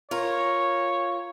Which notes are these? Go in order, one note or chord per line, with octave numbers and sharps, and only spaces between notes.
F4 A#4 C#5